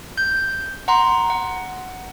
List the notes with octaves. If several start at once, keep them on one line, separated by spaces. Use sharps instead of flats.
G6
F#5 A#5 C6
F#5